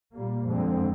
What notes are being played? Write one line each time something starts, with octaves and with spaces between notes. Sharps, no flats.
A#2 G3 A#3
F2 D3 G#3 C4